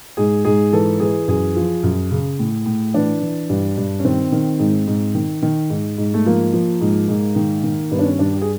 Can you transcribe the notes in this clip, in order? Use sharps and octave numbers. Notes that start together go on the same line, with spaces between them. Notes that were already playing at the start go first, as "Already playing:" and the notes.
G#2 G#4
G#2 G#4
E3 A4
E3 G#4
F#2 G#4
F3
F#2
C#3
A2
A2
E3 D4
E3
G2
G2
C#4
D#3 C4
D#3
G#2
G#2
D#3
D#3
G#2
G#2
A3
F3 A#3
F3
G#2
G#2
D#3
D#3
G2 B3
D4
C#4
G2 D4
G4
G#4